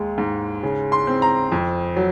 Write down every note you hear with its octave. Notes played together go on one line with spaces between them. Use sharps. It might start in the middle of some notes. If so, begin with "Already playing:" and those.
Already playing: D#2 G#3
G#2
C#3
C6
C4
A#5
F2
F#3